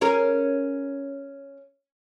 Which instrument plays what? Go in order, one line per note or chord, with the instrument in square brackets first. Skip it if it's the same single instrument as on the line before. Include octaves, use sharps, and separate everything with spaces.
[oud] C#4 G#4 A#4